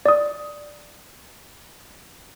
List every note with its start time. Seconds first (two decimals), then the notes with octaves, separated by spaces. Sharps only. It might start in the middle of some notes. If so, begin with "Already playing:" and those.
0.06 D5 D#6